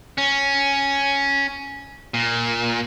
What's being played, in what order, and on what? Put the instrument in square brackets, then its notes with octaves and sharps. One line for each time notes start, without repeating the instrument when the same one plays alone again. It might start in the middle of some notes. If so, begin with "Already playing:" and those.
[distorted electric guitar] C#4
A#2